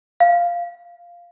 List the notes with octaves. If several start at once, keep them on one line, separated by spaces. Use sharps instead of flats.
F5